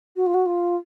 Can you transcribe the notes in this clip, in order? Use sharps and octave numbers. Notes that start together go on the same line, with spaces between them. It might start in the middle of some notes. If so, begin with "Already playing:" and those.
F#4
F4
F#4
F4